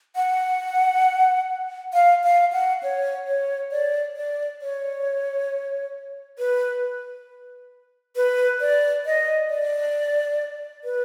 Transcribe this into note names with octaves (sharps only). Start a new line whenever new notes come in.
F#5
F5
F5
F#5
C#5
C#5
D5
D5
C#5
B4
B4
D5
D#5
D5
B4